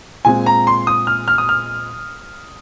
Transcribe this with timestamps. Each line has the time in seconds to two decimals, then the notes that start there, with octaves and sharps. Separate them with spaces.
0.25 A#2 G#3 C4 G#5
0.46 A#5
0.67 C6
0.87 D#6
1.07 F6
1.28 F6
1.38 D#6
1.49 F6